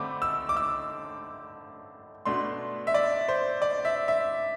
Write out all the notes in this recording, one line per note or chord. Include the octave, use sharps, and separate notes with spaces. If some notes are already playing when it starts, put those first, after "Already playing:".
Already playing: D3 A3 C4 B5 D6
E6
D6
E6
B2 A3 D4 C6
E5
D5
C5
D5
E5
E5